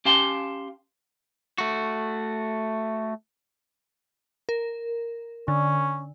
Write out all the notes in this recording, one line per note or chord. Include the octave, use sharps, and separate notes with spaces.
C#4 G4 F5 G5 A5 C6
A3 F#4
A#4
D3 C#4